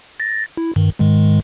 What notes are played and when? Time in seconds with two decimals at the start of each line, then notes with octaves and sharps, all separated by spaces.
0.20 A6 A#6
0.57 E4
0.76 G2 D#3
0.99 G#2 D#3 G#3